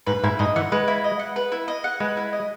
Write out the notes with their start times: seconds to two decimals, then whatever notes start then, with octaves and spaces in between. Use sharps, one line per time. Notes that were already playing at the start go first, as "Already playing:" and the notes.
0.07 G#2 B4
0.24 G#2 E4
0.39 G#2 D#5
0.56 E3 F#5
0.72 G#3 B4
0.88 E4
1.04 D#5
1.19 F#5
1.36 B4
1.52 E4
1.68 D#5
1.84 F#5
2.00 G#3 B4
2.17 E4
2.33 D#5